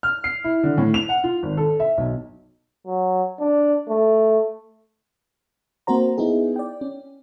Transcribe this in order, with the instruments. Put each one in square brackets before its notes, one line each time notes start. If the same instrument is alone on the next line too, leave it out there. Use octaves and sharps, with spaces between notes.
[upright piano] F6
C7
E4
D3
A2
F7
F#5
F4
G#1
A4
E5
B1
[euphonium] F#3
D4
A3
[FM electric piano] A#3 C4 F#4 C5 A#5
B3 D#4 E4 G#4
D5 G5
C#4